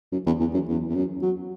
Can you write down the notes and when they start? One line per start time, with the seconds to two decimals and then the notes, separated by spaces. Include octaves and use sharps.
0.12 F#2
0.26 E2
0.40 E2
0.53 F#2
0.68 E2
0.89 E2
0.95 F#2
1.22 F#3